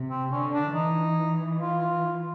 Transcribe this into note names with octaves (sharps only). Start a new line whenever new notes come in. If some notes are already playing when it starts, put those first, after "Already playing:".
Already playing: C3
C4
D3 C#4
D4
E3 D#4
F4